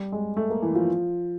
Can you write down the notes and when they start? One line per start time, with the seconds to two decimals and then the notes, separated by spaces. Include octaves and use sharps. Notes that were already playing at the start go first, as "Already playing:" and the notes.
Already playing: G3
0.12 G#3
0.37 A3
0.50 A#3
0.62 E3
0.75 F3